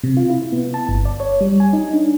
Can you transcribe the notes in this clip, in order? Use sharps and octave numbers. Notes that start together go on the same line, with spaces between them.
C3
F4
E4
B3
A5
G1
D5
C#5
G3
G#5
D#4
D4